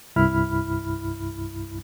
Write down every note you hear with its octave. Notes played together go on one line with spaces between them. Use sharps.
C2 G2 E4 B5 F6